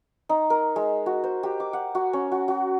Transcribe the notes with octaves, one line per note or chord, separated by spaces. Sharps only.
D#4
A#4
G#3
F#4
C5
G4
D6
F#5
F#4
C#4
F#4
F#4